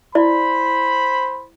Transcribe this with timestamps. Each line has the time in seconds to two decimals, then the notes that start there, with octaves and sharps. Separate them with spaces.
0.15 E4 C5 D5 B5